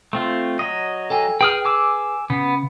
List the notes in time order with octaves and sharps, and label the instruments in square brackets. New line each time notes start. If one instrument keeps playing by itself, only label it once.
[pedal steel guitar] A3 C4 F4
F#3 D#5
[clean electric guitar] A4 G5 G#5
[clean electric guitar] G#4 B4 [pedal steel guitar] G5 D#6 F6
[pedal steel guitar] G#5 D6 E6
[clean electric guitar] C#3 [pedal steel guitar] B3